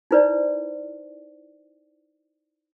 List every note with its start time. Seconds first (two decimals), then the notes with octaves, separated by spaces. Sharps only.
0.11 D#4 E4 B4 C5 D5